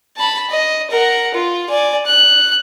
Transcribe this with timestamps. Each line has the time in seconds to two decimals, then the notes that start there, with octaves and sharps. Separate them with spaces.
0.17 A5 B5
0.50 D#5
0.91 A#4 F#5
1.35 F4
1.69 D5 G#5
2.06 F#6